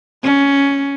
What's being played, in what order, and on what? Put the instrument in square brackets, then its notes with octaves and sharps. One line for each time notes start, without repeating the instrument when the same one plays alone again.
[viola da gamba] C#4